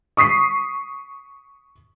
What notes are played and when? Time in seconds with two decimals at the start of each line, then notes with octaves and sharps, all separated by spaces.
0.17 C#6 D#6 B6 C7